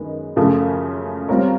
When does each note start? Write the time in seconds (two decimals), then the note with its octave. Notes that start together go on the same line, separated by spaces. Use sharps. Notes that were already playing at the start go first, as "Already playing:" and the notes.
Already playing: F#2 D#3 G#3 B3
0.36 F#2 C#3 F3 A3
1.28 G3 C4 F4 A#4 C#5